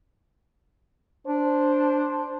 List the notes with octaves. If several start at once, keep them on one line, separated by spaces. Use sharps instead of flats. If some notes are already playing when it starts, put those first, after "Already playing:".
D4 C5